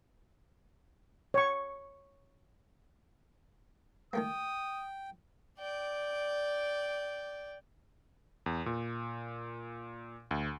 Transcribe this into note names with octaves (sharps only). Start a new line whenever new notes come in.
C#5 C#6
D#3 A3 A#3 G5 D#6
D5 G5
E2
A#2
D2